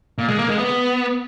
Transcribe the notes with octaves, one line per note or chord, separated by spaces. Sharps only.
A#2
G#3
A#3
G#3
B3